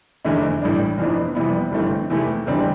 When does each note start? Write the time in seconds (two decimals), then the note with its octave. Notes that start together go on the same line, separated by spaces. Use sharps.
0.25 F1 E2 D3 A3 E4
0.62 A1 A2 G3 D4
0.98 F1 F2 E3 B3 D4
1.35 F2 C3 E3 G3 B3
1.72 G1 G2 E3 A3 C4
2.10 E2 C3 E3 A3 E4
2.47 F1 E2 D3 G3 C4